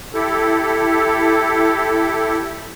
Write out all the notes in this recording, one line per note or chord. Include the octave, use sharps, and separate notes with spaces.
E4 G4 A4